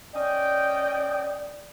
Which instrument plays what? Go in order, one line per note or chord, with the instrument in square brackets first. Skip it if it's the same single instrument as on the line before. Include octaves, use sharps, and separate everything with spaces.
[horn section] C#4 D#5 G5 [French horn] D5